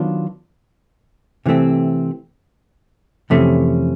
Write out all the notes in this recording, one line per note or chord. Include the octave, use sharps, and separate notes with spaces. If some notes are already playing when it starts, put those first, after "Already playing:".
Already playing: D#3 F#3 B3 D4 F4
C3 E3 A3 C4
F2 C3 E3 A3 C#4